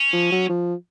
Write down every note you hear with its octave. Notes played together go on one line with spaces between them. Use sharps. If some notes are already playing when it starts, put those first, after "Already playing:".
Already playing: C#4
F3
F#3
F3